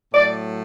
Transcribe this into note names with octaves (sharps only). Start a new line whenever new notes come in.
A2 F#3 A3 D5